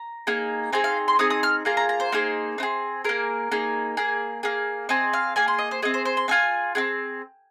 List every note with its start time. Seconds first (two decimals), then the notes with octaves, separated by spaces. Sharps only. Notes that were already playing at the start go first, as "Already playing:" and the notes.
Already playing: A#5
0.27 A#3 D#4 G#4
0.72 C4 D#4 G#4 G#5
0.84 F5
1.08 C6
1.19 C4 D#4 G#4 D#6
1.30 D#6
1.43 F6
1.65 A#3 F4 G#4 A#5
1.77 A#5
1.89 A#5
2.00 C5
2.12 A#3 D#4 G#4
2.58 C4 D#4
2.63 G#4
3.04 A#3 G#4 A#4
3.51 A#3 D#4 G#4
3.97 A#3 G#4
4.43 A#3 G#4
4.89 C4 G#4 D#5
5.13 F5
5.36 A#3 G#4 G#5
5.48 C6
5.58 D#5
5.71 C5
5.82 C4 G#4 D#5
5.94 C5
6.05 C5
6.17 C6
6.28 C4 F4 G#4 G#5
6.75 C4 F4 G#4